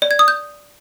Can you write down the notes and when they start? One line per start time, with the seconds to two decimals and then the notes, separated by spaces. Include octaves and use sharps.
0.02 D5
0.11 G#6
0.19 D#6
0.28 G6